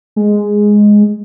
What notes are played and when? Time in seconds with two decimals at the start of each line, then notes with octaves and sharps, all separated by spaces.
0.16 G#3